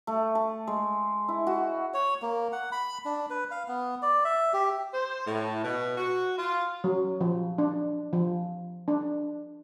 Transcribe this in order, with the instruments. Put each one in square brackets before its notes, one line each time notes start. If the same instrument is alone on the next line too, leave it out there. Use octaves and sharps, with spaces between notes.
[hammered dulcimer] A3
A5
G#3
E4
F#4
[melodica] C#5
A#3
F#5
B5
D4
B4
F5
B3
D5
E5
G4
[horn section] C5
A2
B2
F#4
F4
[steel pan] F#3
F3
D4
F3
D4